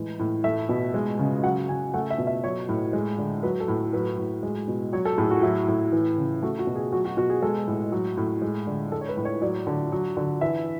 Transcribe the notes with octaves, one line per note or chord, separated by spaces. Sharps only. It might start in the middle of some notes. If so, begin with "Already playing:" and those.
Already playing: A2 E3 G#3
A2
A3 E5
B2
G#3
C#3
F#3 F#5
C#3 G#5
A3 F#5
E5
B2
E5
F#3 C#5
A2
G#3
D3
F#3 B4
A4
A2
F#3 B4
A2
G#3
B2
F#3 C#5
A4
A2 G#4
F#4
F#3 E4
A2
E3
C#3
A3 F#4
F#4
B2
G#4
F#3 F#4
F#4
B2 F#4
G#4
G#3 A4
A2
F#3
A2
G#3
D3
G#3 A4
C#5
B4
A2
C#5
F#3 D5
D3
F#3
D3
E3 E5